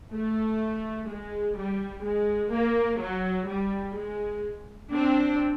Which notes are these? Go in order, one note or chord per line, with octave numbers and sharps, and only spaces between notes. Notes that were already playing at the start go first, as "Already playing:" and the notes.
A3
G#3
G3
G#3
A#3
F#3
G3
G#3
C4 D4